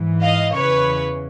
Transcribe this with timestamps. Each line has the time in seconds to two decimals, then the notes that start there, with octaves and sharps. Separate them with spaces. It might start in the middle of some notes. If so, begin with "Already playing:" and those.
Already playing: G#2 E3
0.23 D#5 F5
0.55 E2 C#3 E3 B4 C#5